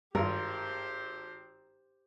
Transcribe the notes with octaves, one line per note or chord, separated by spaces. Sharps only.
G#1 G2 F4 G4 A#4 C5